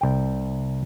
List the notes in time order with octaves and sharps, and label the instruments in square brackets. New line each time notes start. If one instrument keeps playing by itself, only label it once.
[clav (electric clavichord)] C2 G5